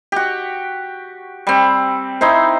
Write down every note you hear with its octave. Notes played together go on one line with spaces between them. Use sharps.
F#4 G4
G3 C4
C4 D#4 E4 C5